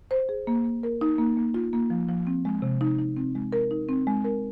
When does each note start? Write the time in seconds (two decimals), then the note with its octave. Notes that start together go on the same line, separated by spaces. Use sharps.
0.11 C5
0.29 G#4
0.47 A#3
0.64 A#3
0.83 A#4
1.01 D#4
1.19 A#3
1.37 A#3
1.54 F4
1.73 A#3
1.90 F3
2.09 F3
2.27 C4
2.45 G#3
2.62 C3
2.81 D#4
2.98 D#4
3.17 C4
3.35 G#3
3.53 A#4
3.71 D#4
3.89 C4
4.07 G#3
4.24 A#4